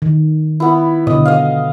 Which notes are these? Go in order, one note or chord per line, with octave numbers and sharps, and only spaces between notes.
D#3
B3 E4
B2 D3 D#5
D#5 F5